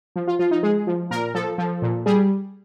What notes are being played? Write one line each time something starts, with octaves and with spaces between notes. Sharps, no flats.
F3
F4
F3 F4
D#4
G#3 G#4
F3
A#2 A#4
F3 A4
F3
A#2
G3 G#4